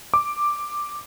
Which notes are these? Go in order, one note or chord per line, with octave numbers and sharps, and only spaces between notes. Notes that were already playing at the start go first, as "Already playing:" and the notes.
D6